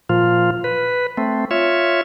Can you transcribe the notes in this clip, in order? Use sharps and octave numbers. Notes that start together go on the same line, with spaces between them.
A#2 F3 F4
B4
A3 C4
F4 C#5 E5